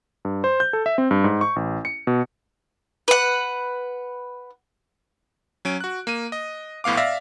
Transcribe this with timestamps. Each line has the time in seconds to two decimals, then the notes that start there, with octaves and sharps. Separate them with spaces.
0.25 G2
0.44 C5
0.60 G6
0.73 A4
0.86 E5
0.98 C4
1.11 G2
1.24 G#2
1.41 C#6
1.56 A1
1.85 C#7
2.07 B2
3.08 B4 F#5
5.65 F#3 C#4 D7
5.80 F#4 F#6
6.07 A#3 D#7
6.32 D#5
6.84 A#1 A2 B3 F5 D6
6.97 D5 E5 F5 F6 A#6